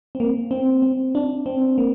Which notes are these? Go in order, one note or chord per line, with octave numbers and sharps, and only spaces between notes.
C4
A#3
C4
C4
D4
C4
A#3